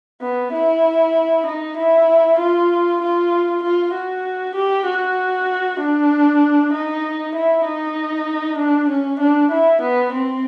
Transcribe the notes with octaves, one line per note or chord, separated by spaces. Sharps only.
B3
E4
D#4
E4
F4
F4
F4
F#4
G4
F#4
D4
D#4
E4
D#4
D4
C#4
D4
E4
B3
C4